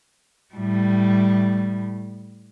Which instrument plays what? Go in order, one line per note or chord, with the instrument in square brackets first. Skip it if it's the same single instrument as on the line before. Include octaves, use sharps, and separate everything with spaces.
[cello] A2 G3